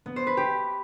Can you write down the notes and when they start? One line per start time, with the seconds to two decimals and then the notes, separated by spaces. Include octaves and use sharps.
0.06 B3
0.16 C5
0.27 B4
0.37 G4